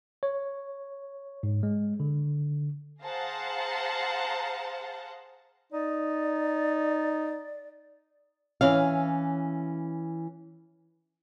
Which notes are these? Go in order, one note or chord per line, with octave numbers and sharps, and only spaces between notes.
C#5
G#2
G#3
D3
G#4 C5 F5 F#5 A5 A#5
D#4 D5
E3 C#4 F5